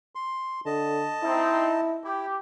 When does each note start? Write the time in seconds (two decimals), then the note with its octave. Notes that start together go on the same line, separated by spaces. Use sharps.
0.15 C6
0.66 D3 D#5 A5
1.23 C4 D#4 E4
2.04 E4 G4